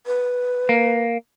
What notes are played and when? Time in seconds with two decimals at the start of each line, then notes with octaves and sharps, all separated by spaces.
0.06 B4
0.69 A#3